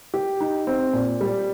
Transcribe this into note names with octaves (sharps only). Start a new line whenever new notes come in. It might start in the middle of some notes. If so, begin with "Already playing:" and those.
G4
D#4
C4
A#2
G3